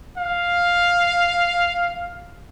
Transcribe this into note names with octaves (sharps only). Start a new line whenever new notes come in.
F5